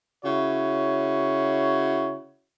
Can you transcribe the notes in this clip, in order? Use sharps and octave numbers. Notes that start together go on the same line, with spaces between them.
C#3 E4 F#4 C#5